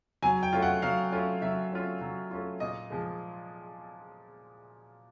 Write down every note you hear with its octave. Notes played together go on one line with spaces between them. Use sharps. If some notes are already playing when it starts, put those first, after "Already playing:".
F#3 G#5
G5
A3 C#4 F4
F#5
F#3 F5
A3 C#4 F4
F#3 E5
A3 C#4 F4
F#3
A3 C#4 F4
A#2 D#5
F3 G#3